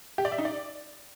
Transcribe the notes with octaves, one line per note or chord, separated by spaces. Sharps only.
G4
D5
E5
D#4
D5